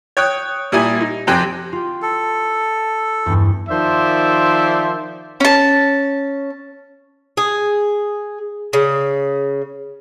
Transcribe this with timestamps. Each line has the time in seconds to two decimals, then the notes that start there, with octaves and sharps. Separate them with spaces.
0.17 C#5 G5 D#6 F#6
0.72 A#2 G3 E4 G#5 D#6
1.01 D#4
1.27 F2 C3 C4 G5 G#5 F#6
1.73 F4 G4
2.02 A4
3.26 E2 G2
3.69 D#3 F3 C5 D5 E5
5.40 C#4 A5
7.37 G#4
8.73 C#3